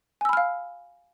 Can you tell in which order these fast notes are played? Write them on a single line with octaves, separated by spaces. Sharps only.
G#5 E6 B5 F6 F5